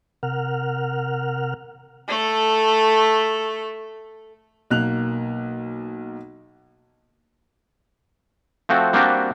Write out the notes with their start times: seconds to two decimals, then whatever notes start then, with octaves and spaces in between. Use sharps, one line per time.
0.23 C3 A#4 F#5 F6
2.08 A3 A4
4.70 B1 A#3 F#6 F7
8.69 F3 A3 C4 F#4
8.93 G3 A#3 C4 D4 F#4 G4